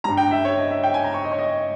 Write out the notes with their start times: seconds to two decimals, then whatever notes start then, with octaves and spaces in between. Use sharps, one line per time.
0.04 G2 G3 A#5
0.17 G5
0.31 E5
0.45 C#5
0.57 D#5
0.71 E5
0.83 G5
0.94 G#5
1.04 A#5
1.14 C#6
1.24 D#5
1.32 C#5
1.38 D#5